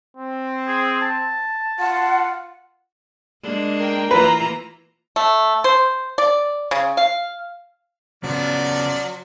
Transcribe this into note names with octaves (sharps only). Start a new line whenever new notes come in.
C4
G#4
A5
F4 F#5
G#3 A#3 D4
A#4 G5
E3 A#3 F4 B4 A#5
A3
C5
D5
C#3
F5
C#3 F3 F#3 B3 D5